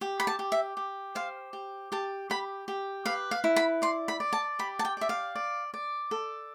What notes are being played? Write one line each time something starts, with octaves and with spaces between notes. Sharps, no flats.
G4
B5
A5
G4
E5
G4
C5 F5
G4
G4 A5
G4 B5
G4
B4 F5
F5
E4
B5
D5 C6
B5
D5
A5
G4 B5
A5
G5
D5 E5
F5
D5
D5
A4